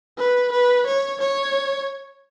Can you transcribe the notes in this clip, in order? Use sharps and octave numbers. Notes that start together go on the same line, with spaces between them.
B4
B4
C#5
C#5